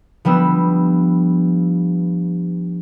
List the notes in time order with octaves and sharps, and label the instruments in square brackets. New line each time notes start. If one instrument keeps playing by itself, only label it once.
[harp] F3 G3 B3 D4 E6